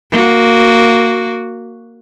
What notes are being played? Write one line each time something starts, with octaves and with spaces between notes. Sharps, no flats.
A#3 F#4